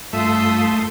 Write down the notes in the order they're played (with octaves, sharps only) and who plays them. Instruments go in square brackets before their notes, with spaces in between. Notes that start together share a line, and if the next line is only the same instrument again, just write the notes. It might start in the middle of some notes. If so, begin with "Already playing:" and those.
[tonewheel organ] G2 F4 [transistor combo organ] A3 [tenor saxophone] E5 [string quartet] C6 D#6